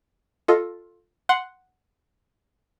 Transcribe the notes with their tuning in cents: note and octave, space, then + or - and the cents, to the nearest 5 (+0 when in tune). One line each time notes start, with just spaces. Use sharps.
F4 +10 A4 +0 D#5 +0
F#5 +0 C6 +0